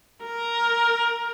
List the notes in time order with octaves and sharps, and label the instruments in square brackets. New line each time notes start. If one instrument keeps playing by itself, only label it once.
[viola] A#4